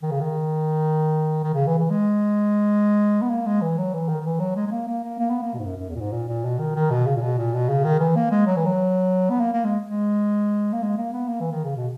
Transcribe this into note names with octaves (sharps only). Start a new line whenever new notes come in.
D#3
C#3
D#3
D#3
C#3
E3
E3
G#3
B3
A#3
G#3
E3
F#3
E3
D#3
D#3
E3
F#3
G#3
G#3
A#3
A#3
A#3
A#3
B3
A#3
B2
G#2
F#2
F#2
E2
A#2
G#2
A#2
A#2
B2
D#3
D#3
B2
C#3
A#2
B2
A#2
B2
C#3
D#3
E3
A#3
G#3
F#3
E3
F#3
B3
A#3
A#3
G#3
G#3
A#3
G#3
A#3
B3
A#3
E3
D#3
C#3
B2